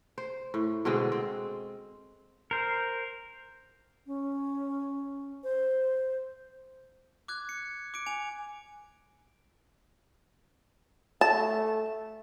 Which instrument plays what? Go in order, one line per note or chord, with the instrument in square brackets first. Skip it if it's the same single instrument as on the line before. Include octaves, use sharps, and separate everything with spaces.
[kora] C5
A2
B2 D3 G#3 C4
C4
[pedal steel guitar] A#4 C5
[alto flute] C#4
C5
[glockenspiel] D6 F#6 G#6
C#7
D6 C#7 D7
G#5 D7 F7
[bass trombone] A3 [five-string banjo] A5